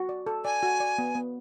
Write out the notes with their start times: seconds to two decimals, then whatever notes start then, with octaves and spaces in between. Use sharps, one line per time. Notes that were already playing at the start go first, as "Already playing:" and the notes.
Already playing: F#4
0.09 D5
0.26 A4
0.45 D5 G#5
0.63 F#4
0.80 D5
0.98 B3
1.15 B3